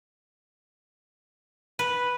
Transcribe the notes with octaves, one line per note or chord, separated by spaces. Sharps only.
B4